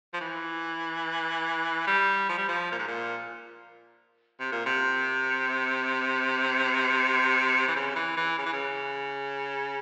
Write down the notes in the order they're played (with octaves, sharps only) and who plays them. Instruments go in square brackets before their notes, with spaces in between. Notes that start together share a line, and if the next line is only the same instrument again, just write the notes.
[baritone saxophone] F3
E3
G3
F3
G3
F3
A#2
G#2
A#2
C3
A#2
C3
E3
C#3
E3
E3
C#3
E3
C#3